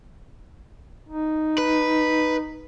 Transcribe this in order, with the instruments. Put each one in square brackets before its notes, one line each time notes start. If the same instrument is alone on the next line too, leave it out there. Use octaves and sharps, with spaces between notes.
[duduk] D#4
[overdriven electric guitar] B4